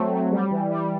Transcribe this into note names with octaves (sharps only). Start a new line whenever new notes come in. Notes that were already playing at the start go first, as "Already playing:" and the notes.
Already playing: F#3 A3 C4
F#3
G3
E3
G3